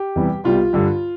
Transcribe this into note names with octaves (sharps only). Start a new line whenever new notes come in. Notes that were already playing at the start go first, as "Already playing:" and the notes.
Already playing: G4
E2 C3 E3 G3
C2 B2 G3 F4
G2 D3 G3